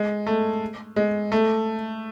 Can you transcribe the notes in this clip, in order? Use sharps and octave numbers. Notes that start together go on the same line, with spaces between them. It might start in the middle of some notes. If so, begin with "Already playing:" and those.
Already playing: G#3
A3
G#3
A3